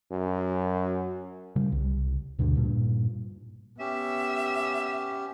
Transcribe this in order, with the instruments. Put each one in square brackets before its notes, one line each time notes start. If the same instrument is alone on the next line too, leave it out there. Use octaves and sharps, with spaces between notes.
[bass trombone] F#2
[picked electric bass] C#3 G3
C2
D2 G2 B2 D3
G2 A#2
[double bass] B3 [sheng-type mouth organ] C#4 G4 [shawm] E5